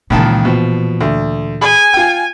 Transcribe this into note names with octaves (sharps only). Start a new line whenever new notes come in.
C#2 A#2 D#3 E3 A5
B2 F3
D2
G#4 G#5 B5
F4 G5